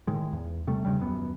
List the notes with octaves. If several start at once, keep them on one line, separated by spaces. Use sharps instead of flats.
A2 D#3 G#3
E2
C3 G3 A3
E2 G2 C#3 G3
D#1 F#2 B3